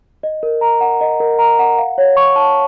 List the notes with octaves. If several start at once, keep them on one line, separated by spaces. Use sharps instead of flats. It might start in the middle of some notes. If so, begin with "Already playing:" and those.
D#5
A#4
A#5
F#5
D#5
A#4
A#5
F#5
F5
C#5
C#6
A5